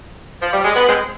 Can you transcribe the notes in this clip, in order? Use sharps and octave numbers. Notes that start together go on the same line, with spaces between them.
F3
G3
G#3
B3
G#3 C4